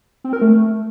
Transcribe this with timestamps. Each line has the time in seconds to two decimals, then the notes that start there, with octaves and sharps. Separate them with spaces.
0.24 C4
0.33 A#4
0.41 A3